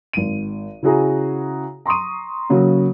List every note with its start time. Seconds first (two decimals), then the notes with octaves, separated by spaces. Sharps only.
0.13 G#1 D#7
0.83 C#3 E4 F#4 G#4 A#5
1.86 A#5 C6 C#6 D#6 D#7
2.50 C#3 F#3 A#3 F#4